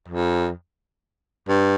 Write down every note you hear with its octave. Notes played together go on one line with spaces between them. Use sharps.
F2
G2